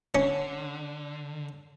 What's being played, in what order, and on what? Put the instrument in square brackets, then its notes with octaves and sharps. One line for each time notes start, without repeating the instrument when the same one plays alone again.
[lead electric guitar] D3 [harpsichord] C#4